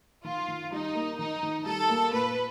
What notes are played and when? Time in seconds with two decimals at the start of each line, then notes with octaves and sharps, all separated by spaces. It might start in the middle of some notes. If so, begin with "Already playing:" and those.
0.24 D#3 F4
0.48 D#3
0.72 G3 D#4
0.95 A#3
1.19 D#3 D#4
1.43 D#3
1.66 G3 A4
1.90 A#3
2.13 A#2 B4